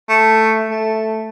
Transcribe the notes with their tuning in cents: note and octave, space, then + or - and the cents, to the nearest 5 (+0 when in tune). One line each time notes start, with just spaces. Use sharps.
A3 +5
A3 +0